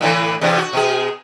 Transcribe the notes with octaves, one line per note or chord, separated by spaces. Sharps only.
A2 D3 E3
E2 C3 D4
F#4
B2 G#4